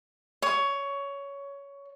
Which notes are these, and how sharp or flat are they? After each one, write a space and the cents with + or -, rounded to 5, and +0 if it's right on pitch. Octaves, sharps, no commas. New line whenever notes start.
C#5 +15